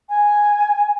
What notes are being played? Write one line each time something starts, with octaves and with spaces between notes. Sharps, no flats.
G#5